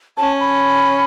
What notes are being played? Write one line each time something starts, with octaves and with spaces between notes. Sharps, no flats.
C#4 A5
B5